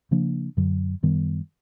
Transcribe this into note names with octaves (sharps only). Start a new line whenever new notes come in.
C#3 F3 A#3 D4
F#2 D3 F#3
F#2 D#3 G3 B3